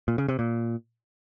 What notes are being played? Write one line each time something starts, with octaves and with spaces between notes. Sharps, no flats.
A#2
C#3
C3
A#2